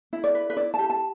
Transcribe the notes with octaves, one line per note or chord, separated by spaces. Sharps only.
E4
D5
B4
B4
E4 D5
G4 A5
A5